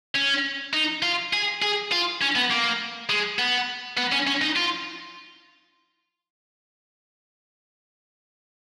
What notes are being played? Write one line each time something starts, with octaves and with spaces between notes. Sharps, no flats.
C#4
D#4
F4
G#4
G#4
F4
C#4
B3
A#3
G#3
B3
B3
C#4
C#4
D#4
F4